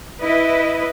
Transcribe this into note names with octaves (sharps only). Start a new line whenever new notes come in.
E4 B4 D#5